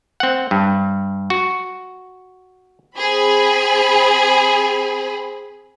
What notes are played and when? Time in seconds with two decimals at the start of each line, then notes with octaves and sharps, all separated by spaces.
0.20 C4 F#5
0.51 G2
1.30 F#4
2.98 C4 G#4 B5